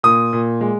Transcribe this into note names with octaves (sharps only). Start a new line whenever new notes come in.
A#2 D#6
A#2
G#3